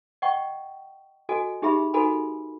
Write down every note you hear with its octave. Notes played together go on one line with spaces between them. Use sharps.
D#5 F#5 G5 C#6
F#4 A4 D#5 G#5
D#4 G4 G#4 E5 B5
D#4 F#4 A4 A#4 G#5 B5